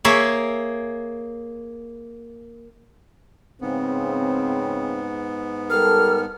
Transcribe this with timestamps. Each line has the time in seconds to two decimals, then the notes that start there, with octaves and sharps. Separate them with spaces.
0.05 A#3 G#4 C#5 E5
3.61 G#2 C#3 B3 C4
5.70 G3 A4 A#4 F6